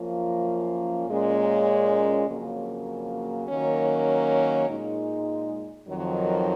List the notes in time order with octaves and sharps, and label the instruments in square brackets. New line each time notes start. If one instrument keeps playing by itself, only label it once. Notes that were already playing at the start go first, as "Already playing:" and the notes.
Already playing: [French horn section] F#2 F3 A#3 C#4 F4
A#2 G#3 C#4
F2 C#3 F#3 A#3
D#3 F#3 A#3 C#4
A#2 G#3 D#4
F2 D#3 F#3